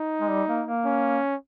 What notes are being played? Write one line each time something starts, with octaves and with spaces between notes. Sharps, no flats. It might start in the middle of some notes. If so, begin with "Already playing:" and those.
Already playing: D#4
G#3
G3
A#3
A#3
C#4